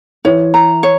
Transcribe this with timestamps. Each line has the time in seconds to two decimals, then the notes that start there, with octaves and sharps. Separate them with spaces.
0.25 E3 C#5
0.54 A#5
0.83 C#5